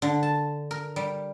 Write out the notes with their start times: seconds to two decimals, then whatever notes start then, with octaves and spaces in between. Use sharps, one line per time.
0.02 D3
0.23 A5
0.71 A#4
0.96 G3